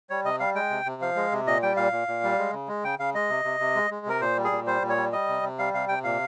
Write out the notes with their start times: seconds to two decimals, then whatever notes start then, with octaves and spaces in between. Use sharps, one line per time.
0.10 G3 C#5
0.24 C3 D#5
0.40 G3 F5
0.55 G#3 G5
0.70 C3
0.86 C3
1.02 F3 F5
1.16 G#3
1.32 C3
1.46 A#2 D#5
1.62 G3 G5
1.77 A#2 F5
1.92 A#2
2.08 A#2
2.24 G3
2.39 G#3
2.53 C#3
2.68 G#3
2.84 C#3 G5
2.99 C#3 F5
3.14 G#3 D#5
3.30 C3
3.45 C3
3.60 C3
3.75 G#3
3.91 G#3
4.06 C3 A#4
4.21 A#2 C5
4.37 G3
4.44 G#4
4.51 A#2
4.66 G3 C5
4.82 A#2
4.89 C#5
4.97 G3
5.13 G3 D#5
5.28 C3
5.43 C3
5.59 G3 F5
5.74 C3 F5
5.88 C3 G5
6.04 A#2 F5